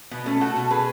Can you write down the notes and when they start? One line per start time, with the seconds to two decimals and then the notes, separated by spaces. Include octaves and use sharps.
0.11 B2 B3
0.26 A3 C#4
0.41 A3 F#4 A4
0.56 B2
0.70 A3 G#4 B4